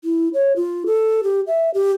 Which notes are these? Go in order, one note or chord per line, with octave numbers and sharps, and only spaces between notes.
E4
C#5
F4
A4
G4
E5
G4